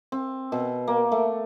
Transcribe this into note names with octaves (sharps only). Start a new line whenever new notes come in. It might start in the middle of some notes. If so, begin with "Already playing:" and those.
C4
B2
A#3
A3